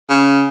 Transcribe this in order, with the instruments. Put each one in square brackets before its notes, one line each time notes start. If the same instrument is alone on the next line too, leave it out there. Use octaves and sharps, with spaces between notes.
[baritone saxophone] C#3